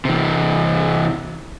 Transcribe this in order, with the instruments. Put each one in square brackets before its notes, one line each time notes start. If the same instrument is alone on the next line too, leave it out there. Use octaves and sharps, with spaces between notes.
[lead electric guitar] C3 E3